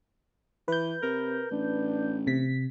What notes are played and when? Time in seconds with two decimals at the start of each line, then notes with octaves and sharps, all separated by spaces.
0.68 E3 B4 G6
1.03 C3 A#4
1.51 A1 D4
2.27 C3 B6